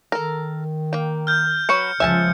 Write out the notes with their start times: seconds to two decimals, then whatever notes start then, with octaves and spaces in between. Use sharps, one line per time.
0.12 D#3 A4 A#4
0.93 A#3 G5
1.27 F6 G6
1.69 F#3 F#4 B4 C#7
2.00 C#2 F3 E5 G#5 A5